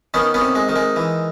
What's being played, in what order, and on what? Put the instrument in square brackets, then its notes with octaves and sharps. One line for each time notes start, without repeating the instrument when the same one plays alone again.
[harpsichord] D#3 B3 C#4
B3 C#4
C3
G#3
D#3
G#3
E3